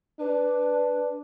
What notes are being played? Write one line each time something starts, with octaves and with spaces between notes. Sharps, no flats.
D4 B4